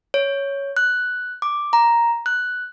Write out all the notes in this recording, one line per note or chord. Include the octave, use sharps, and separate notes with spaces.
C#5
F#6
D6
A#5
F#6